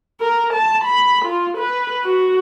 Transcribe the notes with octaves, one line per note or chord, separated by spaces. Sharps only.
A#4
A5
B5
F4
B4
F#4